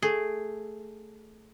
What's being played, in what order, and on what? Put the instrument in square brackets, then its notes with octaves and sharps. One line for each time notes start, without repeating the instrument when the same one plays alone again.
[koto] A3 G#4